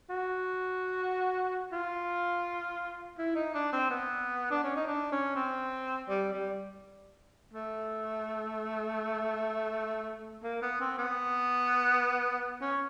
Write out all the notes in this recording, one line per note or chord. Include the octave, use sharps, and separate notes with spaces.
F#4
F4
E4
D#4
D4
C4
B3
D4
C#4
D#4
D4
C#4
C4
G3
G3
A3
A#3
B3
C4
B3
C#4